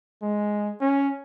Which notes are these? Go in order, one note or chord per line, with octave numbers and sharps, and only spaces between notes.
G#3
C#4